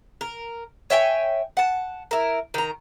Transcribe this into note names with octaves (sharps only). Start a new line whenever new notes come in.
A#4
C#5 E5 G5 G#5
F#5 A5
E4 A#4
D#3 A#5